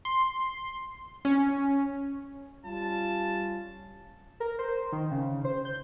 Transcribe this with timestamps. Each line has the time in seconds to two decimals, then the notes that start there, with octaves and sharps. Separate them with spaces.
0.05 C6
1.25 C#4
2.65 G3 C#4 F4 A5
4.40 A#4
4.59 C5
4.92 D#3
5.11 C#3
5.45 C5
5.65 G6